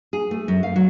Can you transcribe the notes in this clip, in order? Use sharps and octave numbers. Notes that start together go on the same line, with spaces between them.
G#4
A3
F#2
F5
F#3